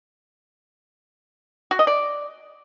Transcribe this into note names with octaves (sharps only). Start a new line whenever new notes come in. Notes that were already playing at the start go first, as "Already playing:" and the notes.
F#4
D#5
D5